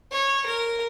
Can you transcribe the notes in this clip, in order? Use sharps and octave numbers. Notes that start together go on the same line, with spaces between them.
C#5
A#4